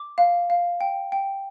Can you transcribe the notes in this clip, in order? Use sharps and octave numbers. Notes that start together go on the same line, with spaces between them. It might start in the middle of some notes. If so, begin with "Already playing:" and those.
Already playing: D6
F5
F5
G5
G5